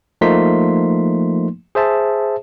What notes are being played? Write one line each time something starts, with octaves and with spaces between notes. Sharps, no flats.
F3 A3 A#3 D#4 C6 B6
G#4 C5 E5 A5